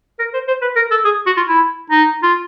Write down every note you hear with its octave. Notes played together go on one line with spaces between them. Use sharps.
A#4
C5
C5
B4
A#4
A4
G#4
F#4
F4
E4
D#4
F4